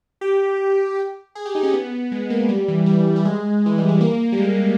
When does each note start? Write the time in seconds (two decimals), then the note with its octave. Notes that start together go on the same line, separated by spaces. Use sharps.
0.21 G4
1.35 G#4
1.45 G4
1.55 D#4
1.63 C#4
1.73 B3
2.12 G#3
2.30 A#3
2.49 G3
2.68 E3
2.86 G3
3.16 G3
3.25 G#3
3.66 E3
3.78 G3
3.89 G#3
4.01 A#3
4.32 G3
4.38 G#3